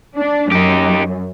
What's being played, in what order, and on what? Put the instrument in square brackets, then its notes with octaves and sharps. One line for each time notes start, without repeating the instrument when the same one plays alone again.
[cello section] D4
[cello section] F#2 [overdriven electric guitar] D#4 G4